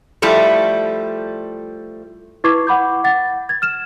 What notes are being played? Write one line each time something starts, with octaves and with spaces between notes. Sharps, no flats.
F3 G3 A3 E4
E4 B4 C#6 D6 G#6 C7
F#5 B5 D6 G6
F#5 A6
G#6 A6
F6 E7